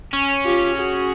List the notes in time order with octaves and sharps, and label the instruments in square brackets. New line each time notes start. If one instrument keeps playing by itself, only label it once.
[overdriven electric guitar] C#4
[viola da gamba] F4 G4
F#4 G#4